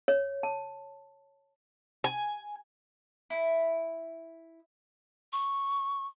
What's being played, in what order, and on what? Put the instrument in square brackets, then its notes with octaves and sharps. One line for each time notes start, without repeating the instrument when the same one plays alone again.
[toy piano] C#5
A5
[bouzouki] G#5
[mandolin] E4
[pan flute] C#6